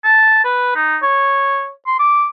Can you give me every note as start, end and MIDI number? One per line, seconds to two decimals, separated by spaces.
0.04 0.43 81
0.44 0.75 71
0.76 0.97 63
1.02 1.70 73
1.87 1.99 84
1.99 2.27 86